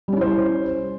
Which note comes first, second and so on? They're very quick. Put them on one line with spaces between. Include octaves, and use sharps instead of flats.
G3 C#4 E4 C5